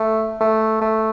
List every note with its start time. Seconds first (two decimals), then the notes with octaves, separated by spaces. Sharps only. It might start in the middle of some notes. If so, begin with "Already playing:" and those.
Already playing: A3
0.41 A3
0.81 A3